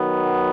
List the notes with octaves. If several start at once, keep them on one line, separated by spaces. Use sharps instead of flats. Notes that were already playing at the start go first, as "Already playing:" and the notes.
Already playing: D#3 F#3 B3